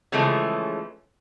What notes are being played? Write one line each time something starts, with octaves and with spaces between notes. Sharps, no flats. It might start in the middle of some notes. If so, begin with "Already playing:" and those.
C#3 E3 F3 G#3 A3 C#4